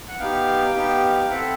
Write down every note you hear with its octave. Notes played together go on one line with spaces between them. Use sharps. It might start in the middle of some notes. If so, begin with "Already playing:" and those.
F#5
B3 D#4 G4 F5 G5
B3 D#4 G4
C4 E4 A4 E5 F#5